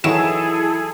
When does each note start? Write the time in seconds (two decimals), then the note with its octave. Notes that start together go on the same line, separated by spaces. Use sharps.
0.04 D#3 E3 F#3 E4 G#4 A4 E7